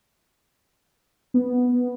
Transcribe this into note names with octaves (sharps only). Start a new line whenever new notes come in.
B3